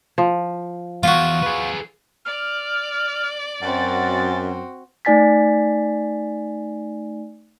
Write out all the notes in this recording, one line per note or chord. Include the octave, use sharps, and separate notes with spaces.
F3
E2 F4 F#4
G#4 B4
D5 F6
F#2 C4 F#4 A6
A3 D#4 D5 G#5 A6 B6